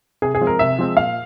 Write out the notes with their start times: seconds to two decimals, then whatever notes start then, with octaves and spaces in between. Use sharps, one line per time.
0.22 C3 G#4
0.35 G#4
0.41 F3 G#3 C4
0.47 A#4
0.59 C3 E5
0.78 F3 G#3 C4
0.97 A#2 F5